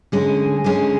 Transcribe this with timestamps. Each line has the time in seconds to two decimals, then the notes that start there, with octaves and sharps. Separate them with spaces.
0.12 D3 G#3 C#4 G#4
0.64 D3 G#3 C#4 G#4